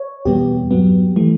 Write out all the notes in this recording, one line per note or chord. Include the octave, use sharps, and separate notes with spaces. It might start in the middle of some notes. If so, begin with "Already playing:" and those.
Already playing: C#5
E2 B2 G3 B3 G4
G2 F#3 B3
E3 A3